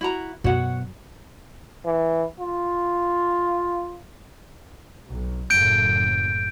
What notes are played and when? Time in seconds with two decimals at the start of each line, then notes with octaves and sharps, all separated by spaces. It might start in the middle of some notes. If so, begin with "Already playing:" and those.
0.01 E4 F#4 A#5
0.44 F#2 B2 F#4 C#5 F#5
1.85 E3
2.40 F4
5.10 B1
5.50 F#1 F#2 A2 G6 D7